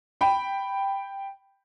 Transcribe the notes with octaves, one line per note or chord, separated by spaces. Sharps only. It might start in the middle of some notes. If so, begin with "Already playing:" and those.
G5 B5